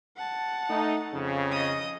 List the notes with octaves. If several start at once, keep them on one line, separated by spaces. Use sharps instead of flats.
F#5 A5
A3 D#4
F2 C#3
D#5 D#6